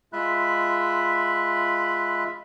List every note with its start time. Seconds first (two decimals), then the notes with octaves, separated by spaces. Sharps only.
0.13 G#3 F4 E5 B5 F#6